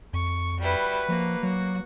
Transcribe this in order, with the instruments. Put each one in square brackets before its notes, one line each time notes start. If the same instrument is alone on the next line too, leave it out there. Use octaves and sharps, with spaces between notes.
[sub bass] F2 [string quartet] C#6
[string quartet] G3 E4 [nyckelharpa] F#4 B4
[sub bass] F3 [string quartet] A#3
[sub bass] F#3 [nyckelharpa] F#4